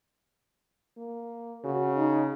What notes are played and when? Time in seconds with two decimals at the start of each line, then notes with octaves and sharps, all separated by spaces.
0.97 A#3
1.64 C#3 F#4
1.96 D#4